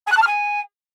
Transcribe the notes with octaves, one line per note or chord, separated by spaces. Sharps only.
G#5
F#6
A5
F6
G#5